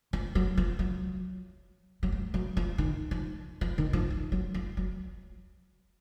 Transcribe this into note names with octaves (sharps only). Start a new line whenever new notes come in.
F3
F#3
F3
F#3
F#3
F3
F#3
F3
D#3
F3
F3
D#3
F3
F3
F#3
F3
F#3